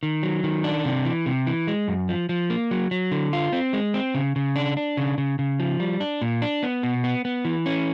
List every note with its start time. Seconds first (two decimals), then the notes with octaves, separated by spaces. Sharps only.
0.03 D#3
0.23 F#3
0.44 D#3
0.64 D4
0.85 C3
1.05 E3
1.26 C3
1.47 E3
1.67 G#3
1.88 F#2
2.09 F3
2.29 F3
2.50 A#3
2.71 F#3
2.91 F#3
3.11 D3
3.33 F4
3.52 C4
3.73 G#3
3.94 C4
4.15 C#3
4.36 C#3
4.56 D4
4.77 D4
4.97 C#3
5.18 C#3
5.39 C#3
5.60 F3
5.80 G3
6.00 D4
6.21 A#2
6.42 D4
6.63 B3
6.83 B2
7.04 B3
7.25 B3
7.45 E3
7.66 C#4